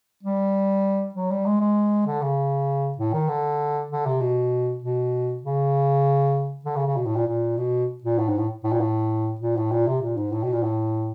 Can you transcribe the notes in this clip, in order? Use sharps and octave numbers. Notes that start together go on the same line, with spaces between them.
G3
F#3
G3
G#3
G#3
D3
C#3
A2
D#3
D3
D3
C3
B2
B2
C#3
D3
C#3
C#3
B2
A2
A#2
A#2
B2
A#2
A2
G#2
A2
A2
A#2
A2
A#2
A2
A#2
C3
A#2
G#2
A2
B2
A#2
A2